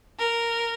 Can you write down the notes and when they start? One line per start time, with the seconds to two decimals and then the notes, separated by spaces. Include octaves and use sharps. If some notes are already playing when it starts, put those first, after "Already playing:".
0.19 A#4